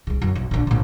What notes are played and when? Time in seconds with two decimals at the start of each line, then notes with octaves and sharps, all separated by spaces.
0.07 C2 C#3
0.22 F#2
0.35 B1
0.51 A#1 D3
0.67 A#1 A2